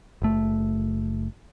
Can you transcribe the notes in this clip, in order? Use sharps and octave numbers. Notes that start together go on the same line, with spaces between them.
F#1 A3